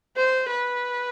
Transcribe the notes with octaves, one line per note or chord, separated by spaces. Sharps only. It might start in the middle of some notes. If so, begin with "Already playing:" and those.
C5
B4